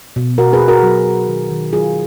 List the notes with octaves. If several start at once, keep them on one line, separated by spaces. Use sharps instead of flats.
B2
B2 F#4 A#4
G#4 B4
B2
F#4 A#4
F#3
F#3
D#3
D#3
F#3 F4 G#4